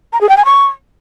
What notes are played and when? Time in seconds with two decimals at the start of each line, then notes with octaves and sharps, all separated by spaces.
0.13 A#5
0.21 G#4
0.29 G5
0.37 G#5
0.45 C#6